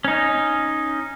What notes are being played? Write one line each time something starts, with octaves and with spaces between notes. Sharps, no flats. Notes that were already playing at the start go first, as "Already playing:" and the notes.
C#4 D#4